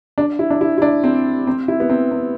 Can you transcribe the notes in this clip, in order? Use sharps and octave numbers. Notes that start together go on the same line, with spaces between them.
D4
E4
D4
E4
E4
D4
C4
C4
E4
B3
C4
C4